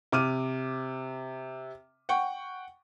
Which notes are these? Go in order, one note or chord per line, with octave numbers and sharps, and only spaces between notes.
C3 D6 F6 D#7
F#5 G5 C#6